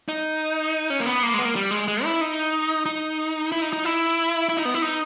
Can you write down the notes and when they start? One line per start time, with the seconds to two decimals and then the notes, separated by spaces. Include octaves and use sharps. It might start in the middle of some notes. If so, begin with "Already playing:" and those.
0.08 D#4
0.90 C#4
1.00 A#3
1.06 B3
1.23 A#3
1.34 G#3
1.39 B3
1.44 A#3
1.56 G3
1.71 G#3
1.88 G#3
2.04 E4
2.21 D#4
2.86 D#4
3.52 E4
3.62 D#4
3.73 D#4
3.85 E4
4.49 E4
4.57 D#4
4.65 B3
4.74 E4
4.82 D#4